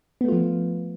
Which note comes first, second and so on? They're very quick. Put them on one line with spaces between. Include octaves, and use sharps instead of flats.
B3 A3 F4 F3